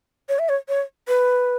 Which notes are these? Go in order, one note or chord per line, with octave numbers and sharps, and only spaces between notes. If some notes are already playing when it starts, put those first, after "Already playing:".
C#5
E5
C#5
C#5
B4